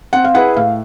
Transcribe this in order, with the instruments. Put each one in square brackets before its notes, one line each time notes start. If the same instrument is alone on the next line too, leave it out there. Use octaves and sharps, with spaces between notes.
[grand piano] C4 [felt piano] F#5
[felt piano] F5
[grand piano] E4 G#4 B4 [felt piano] F#5
[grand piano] A2 [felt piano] F5